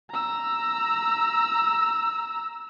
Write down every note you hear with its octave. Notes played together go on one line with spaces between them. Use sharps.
A#5 E6